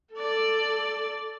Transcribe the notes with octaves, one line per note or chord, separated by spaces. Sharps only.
A4 D5